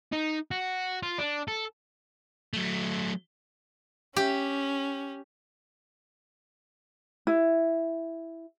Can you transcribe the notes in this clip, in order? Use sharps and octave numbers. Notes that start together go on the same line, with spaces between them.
D#4
F#4
F4
D4
A4
F#3 A3
C#4 G4
E4